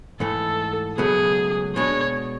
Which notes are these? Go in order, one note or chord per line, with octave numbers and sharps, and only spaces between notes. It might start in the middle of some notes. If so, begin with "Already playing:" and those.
G#2 E3 A3 A4
C#2 B2 F#3 A3 G#4
B2 G#3 D4 C#5